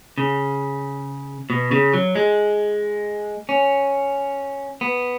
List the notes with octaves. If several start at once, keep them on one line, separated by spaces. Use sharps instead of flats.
C#3
B2
C#3
F#3
G#3
C#4
B3